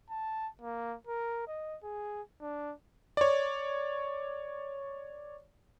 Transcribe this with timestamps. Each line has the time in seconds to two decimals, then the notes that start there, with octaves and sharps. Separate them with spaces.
0.11 A5
0.62 A#3
1.07 A#4
1.48 D#5
1.83 G#4
2.42 D4
3.17 C#5 D5